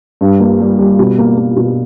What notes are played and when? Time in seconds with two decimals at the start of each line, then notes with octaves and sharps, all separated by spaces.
0.21 G2
0.40 A#3
0.60 G3
0.79 G3
0.99 B2
1.18 A#3
1.37 A#3
1.56 B2